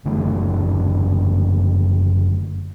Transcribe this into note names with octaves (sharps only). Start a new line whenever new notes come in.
F#1 D3 A3